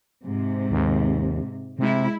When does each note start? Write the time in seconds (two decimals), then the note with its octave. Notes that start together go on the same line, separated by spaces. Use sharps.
0.24 G#2 C3
0.71 D#2
1.79 C3 G#3 E4